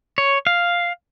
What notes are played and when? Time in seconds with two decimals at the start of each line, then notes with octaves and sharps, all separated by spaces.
0.18 C#5
0.47 F5